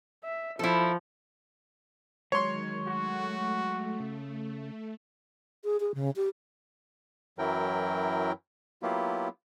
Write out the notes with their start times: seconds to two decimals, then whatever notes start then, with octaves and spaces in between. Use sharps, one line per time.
0.24 E5
0.59 F3 E4 A4
2.32 D#3 F#3 G#3 C#5 C6
2.87 A3 F#4
4.00 C#3
5.64 G#4
5.80 G#4
5.95 C#3
6.16 G4
7.38 F#2 E3 F#3 E4 A#4 G5
8.83 F#3 A#3 B3 E4 F4 G4